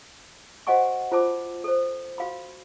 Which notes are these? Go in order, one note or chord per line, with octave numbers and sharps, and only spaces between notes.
F#4 C5 D#5 F#5 G#5 C#6
F4 C5 A5 D6
A4 C5
F#4 F5 B5